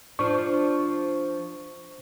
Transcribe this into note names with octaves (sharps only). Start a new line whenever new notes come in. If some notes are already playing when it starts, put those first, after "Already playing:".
F3 D4 C#6